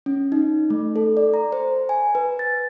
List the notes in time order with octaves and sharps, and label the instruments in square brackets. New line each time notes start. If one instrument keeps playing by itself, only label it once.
[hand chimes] C#4
D#4
A3
A4
D5
A#5
C5
G#5
B4
A6